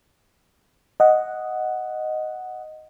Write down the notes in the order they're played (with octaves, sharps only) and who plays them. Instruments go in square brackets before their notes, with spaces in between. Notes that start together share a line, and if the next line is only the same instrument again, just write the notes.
[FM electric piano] D#5 F#5